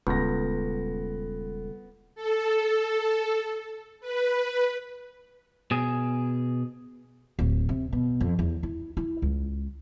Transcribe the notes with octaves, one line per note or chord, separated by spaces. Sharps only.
D#1 C#2 G3 B3 A4 A#6
A4
B4
B2 G#4
D1
C3
B2
F2
E2
E4
E4
C#2